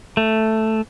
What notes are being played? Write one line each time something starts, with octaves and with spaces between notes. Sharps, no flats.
A3